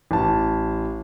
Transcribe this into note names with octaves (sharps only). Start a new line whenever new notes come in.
A1 A5